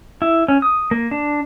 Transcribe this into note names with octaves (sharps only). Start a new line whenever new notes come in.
E4
C#4
D#6
A#3
D4